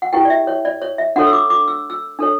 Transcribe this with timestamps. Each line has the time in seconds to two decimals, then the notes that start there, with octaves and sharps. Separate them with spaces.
0.02 F#5
0.13 E4 G4 B4 G5
0.25 D5
0.30 E5
0.47 C#5
0.65 D5
0.82 C#5
0.98 E5
1.16 D4 F#4 A4 C#5 F#5
1.27 E6
1.33 D6
1.50 D6
1.68 E6
1.90 E6
2.19 D4 A4 C#5